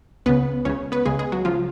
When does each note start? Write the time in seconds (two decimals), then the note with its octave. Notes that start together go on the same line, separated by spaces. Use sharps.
0.26 C#2 C#3 B3 B4
0.65 C#2 C#3 C#4 C#5
0.92 B3 B4
1.05 C#2 C#3 G#3 G#4
1.19 G#3 G#4
1.32 F#3 F#4
1.45 C#3 F3 F4